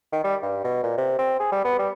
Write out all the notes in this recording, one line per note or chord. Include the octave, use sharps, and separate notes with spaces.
D#3
G3
G2
B2
A#2
C3
C4
G#4
G3
B3
G3